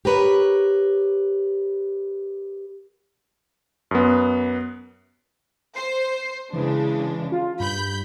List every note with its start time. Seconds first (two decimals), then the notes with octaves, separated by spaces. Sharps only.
0.05 G4 A#4 B4 C#5
3.91 F#2 B3
5.76 C5 C7
6.53 C#3 E3 G#3 D4
7.32 F4
7.60 G2 B5 G6